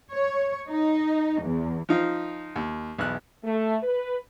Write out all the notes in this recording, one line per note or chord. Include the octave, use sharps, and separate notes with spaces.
C#5
D#4
E2
F3 D#4 F4
D#2
B1 E2 F#6
A3
B4